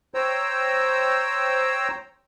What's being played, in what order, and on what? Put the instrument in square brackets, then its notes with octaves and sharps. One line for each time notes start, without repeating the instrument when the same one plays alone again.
[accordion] C5 C#5 G5 A#5 E6